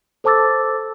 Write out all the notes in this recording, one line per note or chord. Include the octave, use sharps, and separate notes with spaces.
A4 C5 A5 D6 E6 A6